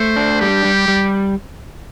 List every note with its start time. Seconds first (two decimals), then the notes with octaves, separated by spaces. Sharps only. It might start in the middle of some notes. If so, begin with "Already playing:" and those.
Already playing: A3 C5
0.16 D4
0.40 G3 G4
0.65 G3
0.88 G3